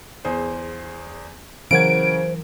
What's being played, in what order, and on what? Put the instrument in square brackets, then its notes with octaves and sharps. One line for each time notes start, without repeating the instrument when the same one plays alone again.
[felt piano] E2 G#4 C5
[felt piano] C#3 F#5 G#6 [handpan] E3 F#3 A#4 [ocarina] C5 [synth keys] D7